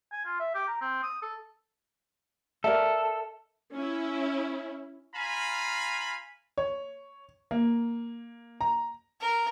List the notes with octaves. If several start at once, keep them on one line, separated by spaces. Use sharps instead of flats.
G#5
F4
E5
G4
A#5
C4
D#6
A4
A4 A#4 D5 E5
C#4 E4
F4 F5 G#5 A#5 B5
C#5
A#3
A#5
A#4